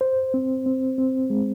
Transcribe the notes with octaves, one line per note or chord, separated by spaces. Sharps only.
C5
C4
C4
C4
G#3